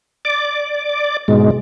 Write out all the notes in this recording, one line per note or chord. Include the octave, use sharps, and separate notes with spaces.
D5 D6
G#2 B2 G#3